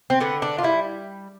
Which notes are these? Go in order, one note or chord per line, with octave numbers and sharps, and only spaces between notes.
C4
D3 B3
D4
F4
G3 E4